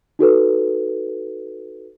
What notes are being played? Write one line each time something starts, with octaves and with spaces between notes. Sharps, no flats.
D#4 F#4 A4 B4